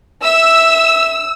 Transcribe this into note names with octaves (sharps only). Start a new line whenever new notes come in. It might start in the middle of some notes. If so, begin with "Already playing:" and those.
E5 E6